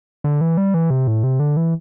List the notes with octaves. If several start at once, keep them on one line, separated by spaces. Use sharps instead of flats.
D3
E3
G3
E3
C3
A2
C3
D3
E3